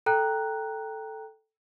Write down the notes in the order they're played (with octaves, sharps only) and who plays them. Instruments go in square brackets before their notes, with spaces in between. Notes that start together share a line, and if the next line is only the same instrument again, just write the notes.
[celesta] A4 G5 A#5 F#6